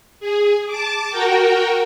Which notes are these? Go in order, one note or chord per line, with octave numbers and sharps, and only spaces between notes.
G#4
A5 D6
F#4 A#4 G5